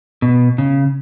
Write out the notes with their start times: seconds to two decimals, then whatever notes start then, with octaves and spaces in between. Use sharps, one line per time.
0.22 B2
0.58 C#3